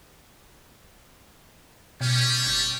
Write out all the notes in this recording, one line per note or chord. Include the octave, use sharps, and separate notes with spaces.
B2 G3 C#4
F#1